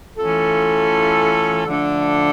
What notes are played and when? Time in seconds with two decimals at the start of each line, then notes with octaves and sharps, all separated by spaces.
0.16 E3 A3 C#4 F4 A4
1.66 D3 F3 A3 D4 A4